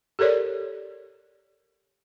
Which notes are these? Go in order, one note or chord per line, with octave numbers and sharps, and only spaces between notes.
G4 A4 A#4 C#5 D5